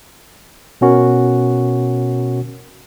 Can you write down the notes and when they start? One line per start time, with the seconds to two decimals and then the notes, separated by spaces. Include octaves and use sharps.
0.81 B2 C#4 F#4 A#4